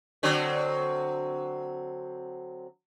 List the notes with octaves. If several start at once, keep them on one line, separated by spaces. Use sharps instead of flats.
D3 F#3 C4